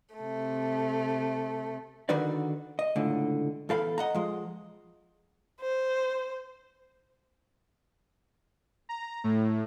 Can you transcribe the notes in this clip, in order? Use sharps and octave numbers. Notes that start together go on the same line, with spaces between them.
C3 A3
D3 D#3 D#4 F#4 B4 D5
D#5
C#2 A2 D3
E2 A4 F5 B5
D#5 F#5 A#5
F3 G#3
C5
A#5
A2